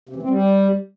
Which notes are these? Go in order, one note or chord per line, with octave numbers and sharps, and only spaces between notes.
C3
E3
C4
G3